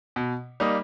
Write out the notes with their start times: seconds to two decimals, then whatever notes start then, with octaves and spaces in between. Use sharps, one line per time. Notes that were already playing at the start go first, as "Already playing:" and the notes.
0.16 B2
0.60 G3 A#3 D#4